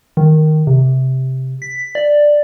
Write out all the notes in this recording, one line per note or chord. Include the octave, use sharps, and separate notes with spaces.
D#3
C3
B6
D5